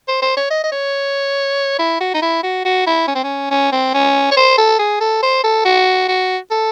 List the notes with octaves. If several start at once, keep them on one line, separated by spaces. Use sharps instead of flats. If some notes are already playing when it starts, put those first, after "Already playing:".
C5
C5
C#5
D#5
D#5
C#5
E4
F#4
D#4
E4
F#4
F#4
E4
C#4
C4
C#4
C#4
C4
C#4
C#5
C5
A4
G#4
A4
C5
A4
F#4
F#4
A4